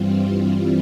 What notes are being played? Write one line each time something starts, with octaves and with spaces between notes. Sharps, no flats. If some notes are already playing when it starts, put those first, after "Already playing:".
Already playing: G2 E3 G3 C4 F4